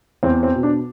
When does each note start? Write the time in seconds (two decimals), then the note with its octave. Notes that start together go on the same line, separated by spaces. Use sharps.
0.23 E2 C4
0.43 C4
0.54 B2
0.63 D4